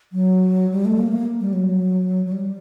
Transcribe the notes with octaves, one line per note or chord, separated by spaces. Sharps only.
F#3
G3
A3
A#3
A#3
G3
F#3
F#3
G3